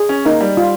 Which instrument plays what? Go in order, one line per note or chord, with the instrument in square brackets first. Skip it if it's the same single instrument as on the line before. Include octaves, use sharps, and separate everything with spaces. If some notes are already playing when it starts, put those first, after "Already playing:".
Already playing: [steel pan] G#4
[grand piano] C#4
[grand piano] A#3 [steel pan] D#4
[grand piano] G3
[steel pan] F4